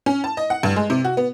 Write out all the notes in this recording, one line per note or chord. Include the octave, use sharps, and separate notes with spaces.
C#4
A5
D#5
F#5
G2
G#3
C3
F#4
B3